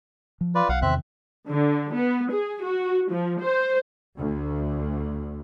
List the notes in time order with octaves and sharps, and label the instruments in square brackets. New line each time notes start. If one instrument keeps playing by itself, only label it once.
[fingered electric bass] F3
[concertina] F4 B4 D5
[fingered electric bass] B1 [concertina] F5 F#5
[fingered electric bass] E2 C3 D#3 [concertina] C4 E5 F#6
[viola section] D3
B3
G#4
F#4
F3
C5
[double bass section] D2